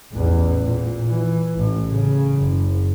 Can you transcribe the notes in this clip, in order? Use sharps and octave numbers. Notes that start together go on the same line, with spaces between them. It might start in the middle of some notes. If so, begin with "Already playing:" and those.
A1 E2
A#2
E3
A1 A2
C#3
F#1